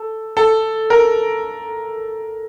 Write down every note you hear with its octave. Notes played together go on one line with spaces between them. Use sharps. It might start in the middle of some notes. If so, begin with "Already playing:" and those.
Already playing: A4
A4
A#4